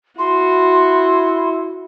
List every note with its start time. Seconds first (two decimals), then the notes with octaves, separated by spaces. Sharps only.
0.19 E4 F#4 C6